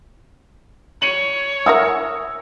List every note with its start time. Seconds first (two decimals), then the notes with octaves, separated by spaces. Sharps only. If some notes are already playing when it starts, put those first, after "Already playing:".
1.02 C#5 C#7 D#7 F#7
1.66 A#4 E5 F#5 G#5 D#6 E6